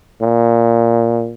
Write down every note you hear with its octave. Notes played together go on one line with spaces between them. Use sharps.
A#2